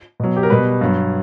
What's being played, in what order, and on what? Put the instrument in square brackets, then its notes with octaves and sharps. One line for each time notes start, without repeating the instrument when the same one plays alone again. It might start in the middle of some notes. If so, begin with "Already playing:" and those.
[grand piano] B2 F#3
G4
A#4
B2 G3 B4
G2 F#3